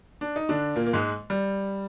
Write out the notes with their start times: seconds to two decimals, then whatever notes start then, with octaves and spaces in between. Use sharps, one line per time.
0.21 D4
0.36 D#4
0.49 D3 D4
0.75 A#2 A#3
0.87 A#3
0.93 G#2 G#3
1.30 G3